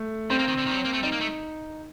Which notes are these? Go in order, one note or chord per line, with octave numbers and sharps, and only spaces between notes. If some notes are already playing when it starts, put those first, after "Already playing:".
Already playing: A3
G3 C4
A#3
D#3
D3
D#3
G3
F#3
A#3
A3
G3 D#4
A#3
A3